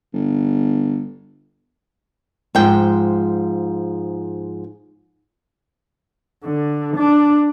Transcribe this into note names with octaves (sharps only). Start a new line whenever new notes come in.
G1
G#2 F3 G5
D3
D4